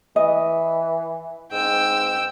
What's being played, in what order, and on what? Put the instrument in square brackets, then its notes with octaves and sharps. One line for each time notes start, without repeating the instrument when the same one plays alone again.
[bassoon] E3 [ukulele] D#5
[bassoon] G#2 [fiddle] G5 E6